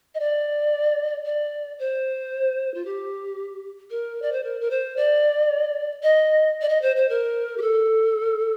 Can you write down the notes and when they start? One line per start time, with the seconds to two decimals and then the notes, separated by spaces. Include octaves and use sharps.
0.14 D#5
0.20 D5
1.25 D5
1.79 C5
2.74 F4
2.85 G4
3.90 A#4
4.22 D5
4.32 C5
4.44 A#4
4.61 A#4
4.70 C5
4.96 D5
6.03 D#5
6.61 D5
6.69 D#5
6.82 C5
6.96 C5
7.09 A#4
7.58 G4
7.62 A4